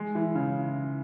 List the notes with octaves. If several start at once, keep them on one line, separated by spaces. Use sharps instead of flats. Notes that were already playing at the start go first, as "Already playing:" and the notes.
Already playing: G#3
E3
C#3